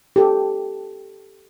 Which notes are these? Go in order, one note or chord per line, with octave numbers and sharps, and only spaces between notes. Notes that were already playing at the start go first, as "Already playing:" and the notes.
G4 A4